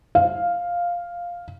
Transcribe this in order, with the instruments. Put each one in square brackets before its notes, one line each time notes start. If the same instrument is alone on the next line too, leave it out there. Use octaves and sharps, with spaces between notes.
[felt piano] F5